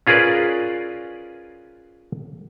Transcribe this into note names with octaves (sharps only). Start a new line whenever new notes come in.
C#4 F4 G#4 A#4 B4 D5